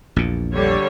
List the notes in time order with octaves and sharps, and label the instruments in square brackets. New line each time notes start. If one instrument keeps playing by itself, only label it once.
[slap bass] A#1 E2 A#2
[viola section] D3 G3 C#5